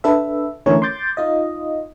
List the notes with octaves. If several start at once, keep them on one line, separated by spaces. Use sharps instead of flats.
D4 A4 B4 E5
D3 E3 A3 C#4 A#4 C#5
C6 D6 G6 A6
D#4 F4 D#5